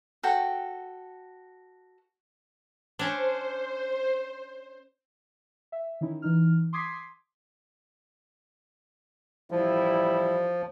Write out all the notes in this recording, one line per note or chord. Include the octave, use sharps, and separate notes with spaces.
F#4 A4 G5
C#4 D4 C5
E5
D#3 C#4 D#4 E4
E3 D#4 F6
C6 D6 D#6 G#6 B6 C7
A1 F3 G3 E4